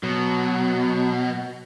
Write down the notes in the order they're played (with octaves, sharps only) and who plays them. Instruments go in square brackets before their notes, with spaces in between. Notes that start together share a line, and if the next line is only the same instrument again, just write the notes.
[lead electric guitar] B2 [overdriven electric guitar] F#3